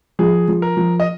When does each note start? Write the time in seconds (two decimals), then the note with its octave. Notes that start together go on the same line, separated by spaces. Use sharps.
0.19 F3 G#4
0.48 F3
0.62 A#4
0.77 F3
1.00 D#5